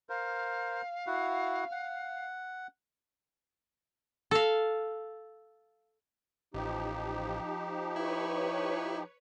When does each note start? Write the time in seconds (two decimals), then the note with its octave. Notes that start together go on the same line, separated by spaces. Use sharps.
0.09 A#4 C5 F5
1.07 E4 F#4 F#5
1.72 F#5
4.31 A4 F5
6.54 A1 F3 D#4 G4
7.96 E4 B4 C#5 C#6